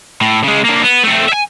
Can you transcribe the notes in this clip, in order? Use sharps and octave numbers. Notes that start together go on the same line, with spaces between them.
A2
C#3 G#3
D3 A#3
B3
A3 C4
E5 G#5